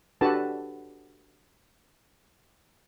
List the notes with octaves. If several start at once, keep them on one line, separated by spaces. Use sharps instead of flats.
D4 F#4 G4 A4 B4 A5